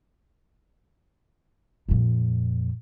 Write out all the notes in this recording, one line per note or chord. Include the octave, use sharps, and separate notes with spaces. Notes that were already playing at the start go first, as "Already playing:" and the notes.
F2 A#2